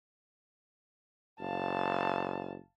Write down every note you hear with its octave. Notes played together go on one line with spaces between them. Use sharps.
F#1 F5 A5